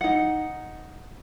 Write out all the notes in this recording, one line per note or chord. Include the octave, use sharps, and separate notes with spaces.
D#4 F#5